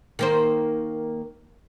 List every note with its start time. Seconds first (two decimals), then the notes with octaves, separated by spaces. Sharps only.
0.19 D#3 A#3 C5